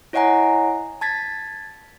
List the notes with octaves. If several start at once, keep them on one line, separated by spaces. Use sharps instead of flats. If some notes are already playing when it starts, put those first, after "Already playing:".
E4 C#5 D#5 F#5 G#5 A#5
A5 G#6 A6 B6